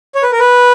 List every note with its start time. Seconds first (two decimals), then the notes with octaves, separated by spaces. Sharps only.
0.15 C#5
0.23 B4
0.32 A#4
0.39 B4